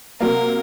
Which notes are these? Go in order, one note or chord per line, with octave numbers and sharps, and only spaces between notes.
C3 F#3 A#3 A#4